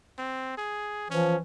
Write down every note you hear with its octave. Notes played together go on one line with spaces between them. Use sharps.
C4
G#4
E3 F3 C#4